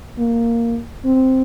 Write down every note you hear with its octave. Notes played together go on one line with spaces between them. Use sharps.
A#3
C4